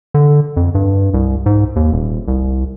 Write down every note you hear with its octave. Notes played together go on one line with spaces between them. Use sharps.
D3
F2
G2
C2
G#2
D#2
D#1
C2